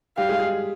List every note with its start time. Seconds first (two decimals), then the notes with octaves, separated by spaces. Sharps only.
0.17 G3 G4 F5
0.29 G#3 G#4
0.39 G#3 G#4